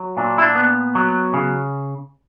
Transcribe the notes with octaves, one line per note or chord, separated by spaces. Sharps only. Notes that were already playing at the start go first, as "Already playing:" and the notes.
Already playing: F#3
A#2 D4
E4
D4
B3
F#3
C#3